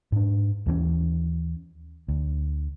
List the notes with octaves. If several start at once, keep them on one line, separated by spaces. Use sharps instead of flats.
G#2 D4
D#2 E3 A3 C#4
D2